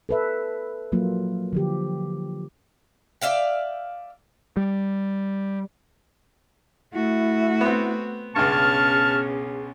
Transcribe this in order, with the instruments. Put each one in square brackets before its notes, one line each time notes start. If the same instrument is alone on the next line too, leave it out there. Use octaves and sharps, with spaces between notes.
[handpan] A4 B4 E5
F3 F#3 A#3 F4
D3 F3 G4
[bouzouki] D5 E5 F5 G5
[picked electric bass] G3
[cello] A3 F#4 [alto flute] E4
[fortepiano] B3 C4
[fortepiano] C#2 G2 [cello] B2 C#4 [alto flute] G#4 [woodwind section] A5 C#6 F6